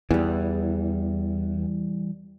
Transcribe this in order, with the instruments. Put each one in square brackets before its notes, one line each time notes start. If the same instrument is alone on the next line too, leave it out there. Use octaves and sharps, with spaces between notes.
[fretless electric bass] E2 [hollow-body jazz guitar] E3 G3